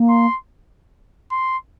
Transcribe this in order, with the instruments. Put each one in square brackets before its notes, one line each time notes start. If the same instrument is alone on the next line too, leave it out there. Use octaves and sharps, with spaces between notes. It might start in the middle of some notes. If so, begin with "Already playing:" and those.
Already playing: [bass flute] A#3
[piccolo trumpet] C6
C6